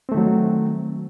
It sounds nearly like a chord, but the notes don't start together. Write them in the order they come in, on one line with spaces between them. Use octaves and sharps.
C4 A3 D#3 F#3